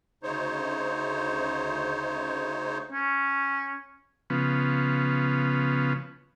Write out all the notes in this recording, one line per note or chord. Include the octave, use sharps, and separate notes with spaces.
D2 C#3 D#4 C5 C#5
C#4
C#3 F3 B3